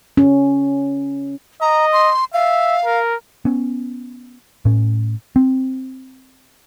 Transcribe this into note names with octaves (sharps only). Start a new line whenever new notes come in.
C#4
D#5 A#5
C6
E5 F5
A#4
B3 C#4
A2 C#4
C4